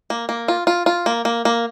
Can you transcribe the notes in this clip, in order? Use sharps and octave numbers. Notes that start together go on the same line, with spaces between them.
A#3
A#3
F4
F4
F4
A#3
A#3
A#3